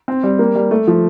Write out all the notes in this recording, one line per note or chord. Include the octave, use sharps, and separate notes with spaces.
C4
G3
A#3
G3
A3
F3